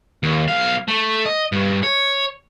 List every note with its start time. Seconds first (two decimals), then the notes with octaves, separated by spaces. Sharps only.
0.23 D#2
0.48 B1 F5
0.88 A3
1.26 D#5
1.52 G2
1.83 C#5